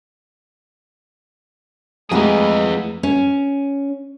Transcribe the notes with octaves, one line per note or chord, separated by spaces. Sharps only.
F2 E3 G#3 A3 G#4 B4 F#5 A#5
C#4